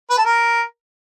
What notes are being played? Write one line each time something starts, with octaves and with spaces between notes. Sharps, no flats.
B4
A4
A#4